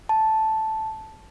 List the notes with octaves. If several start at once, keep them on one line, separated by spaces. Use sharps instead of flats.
A5